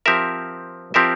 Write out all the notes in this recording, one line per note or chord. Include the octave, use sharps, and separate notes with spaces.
F3 C4 G4 A#4 E5
F3 C4 G4 A#4 E5